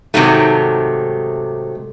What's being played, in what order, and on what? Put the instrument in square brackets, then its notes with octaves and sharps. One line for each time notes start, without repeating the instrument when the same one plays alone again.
[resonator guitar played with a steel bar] G#2 C3 D#3 F#3 A3